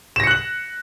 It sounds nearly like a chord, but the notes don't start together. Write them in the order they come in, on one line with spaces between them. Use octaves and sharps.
E7 A#6 C#7 F#6 F#7